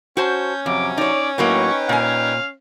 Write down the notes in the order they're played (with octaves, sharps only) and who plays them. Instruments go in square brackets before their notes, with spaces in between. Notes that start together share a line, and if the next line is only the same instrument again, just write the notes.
[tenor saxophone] C#4 [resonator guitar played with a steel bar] F#4 C5 A5 [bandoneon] G6
[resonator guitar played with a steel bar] F2 [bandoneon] C3 F#3 [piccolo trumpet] D6
[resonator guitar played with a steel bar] D#4 C#5 [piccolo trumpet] D5
[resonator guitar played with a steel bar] A2 F#3 A#3 [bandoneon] D#4 B4 G5 [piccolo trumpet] C#6
[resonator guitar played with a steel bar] A#2 G#5 [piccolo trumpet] F5